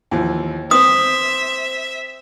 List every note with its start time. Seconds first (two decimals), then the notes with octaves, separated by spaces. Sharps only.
0.11 D#2 E3 F3
0.71 C4 C5 E5 D#6